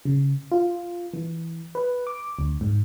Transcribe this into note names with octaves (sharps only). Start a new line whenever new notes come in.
C#3
F4
E3
B4
D6
D2
G#2